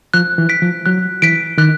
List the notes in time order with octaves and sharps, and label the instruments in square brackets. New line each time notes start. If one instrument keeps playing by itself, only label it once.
[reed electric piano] F3 [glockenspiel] F#6
[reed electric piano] E3
[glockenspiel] B6 D7
[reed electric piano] F3
[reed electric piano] F#3 [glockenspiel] F#6
[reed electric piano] E3 [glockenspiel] B6 D7
[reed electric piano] D#3 [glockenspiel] F#6